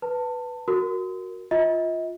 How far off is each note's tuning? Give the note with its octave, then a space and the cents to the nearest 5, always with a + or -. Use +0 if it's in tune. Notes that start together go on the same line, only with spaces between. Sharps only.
B4 +0 A5 +25
F#4 +0 A#4 -5
F4 +0 D#5 +40